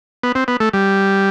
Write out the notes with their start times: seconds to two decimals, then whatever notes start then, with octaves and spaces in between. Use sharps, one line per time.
0.23 B3
0.35 C4
0.48 B3
0.60 A3
0.73 G3